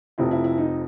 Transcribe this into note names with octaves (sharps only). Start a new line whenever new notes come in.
F1 F2 C3 F3 E4
E4
E4
D#4